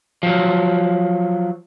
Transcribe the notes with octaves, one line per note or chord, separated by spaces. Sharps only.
F3 F#3